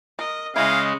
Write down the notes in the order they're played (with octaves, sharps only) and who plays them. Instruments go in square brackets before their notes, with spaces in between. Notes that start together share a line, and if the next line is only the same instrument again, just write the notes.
[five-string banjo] A#4 [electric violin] D#5
[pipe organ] C#3 G#3 [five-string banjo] E3 E4 [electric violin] D#5 [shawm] F5